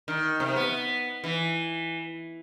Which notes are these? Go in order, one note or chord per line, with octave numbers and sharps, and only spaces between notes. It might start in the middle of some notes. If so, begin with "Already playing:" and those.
D#3
C3
B3
E3